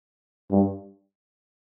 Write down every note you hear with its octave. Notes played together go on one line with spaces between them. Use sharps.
G2